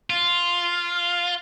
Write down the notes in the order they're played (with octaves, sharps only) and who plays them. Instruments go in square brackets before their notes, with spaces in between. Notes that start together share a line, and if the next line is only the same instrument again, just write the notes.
[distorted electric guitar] F4